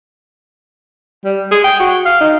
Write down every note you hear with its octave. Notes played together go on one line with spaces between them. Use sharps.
G3
G#4
G5
F#4
F5
D#4